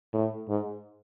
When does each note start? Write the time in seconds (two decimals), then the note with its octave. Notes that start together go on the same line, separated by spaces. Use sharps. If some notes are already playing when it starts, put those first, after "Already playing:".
0.13 A2
0.49 G#2